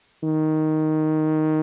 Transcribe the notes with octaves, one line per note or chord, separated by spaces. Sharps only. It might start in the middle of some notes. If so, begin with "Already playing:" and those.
D#3